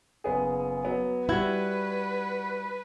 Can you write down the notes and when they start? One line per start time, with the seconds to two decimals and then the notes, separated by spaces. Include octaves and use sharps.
0.24 F#1 B3 G#4
0.85 F#3 B3
1.29 G3 E4 F#4 B4 G#6